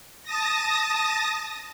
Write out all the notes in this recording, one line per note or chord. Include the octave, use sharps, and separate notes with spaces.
A5 D#6 A#6